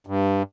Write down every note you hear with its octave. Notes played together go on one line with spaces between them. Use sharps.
G2